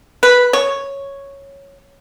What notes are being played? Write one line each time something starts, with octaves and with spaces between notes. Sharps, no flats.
B4
C#5